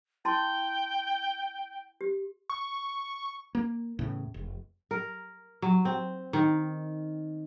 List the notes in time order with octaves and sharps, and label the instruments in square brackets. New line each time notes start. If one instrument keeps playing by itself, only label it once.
[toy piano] E4 A5 C6 [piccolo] G5
[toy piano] G4
[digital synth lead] C#6
[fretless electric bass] A#3
E2 A2 C#3
F1
[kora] A#4
F#3
C4
D#3